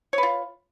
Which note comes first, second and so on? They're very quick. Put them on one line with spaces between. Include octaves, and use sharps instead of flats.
C#5 B4 F4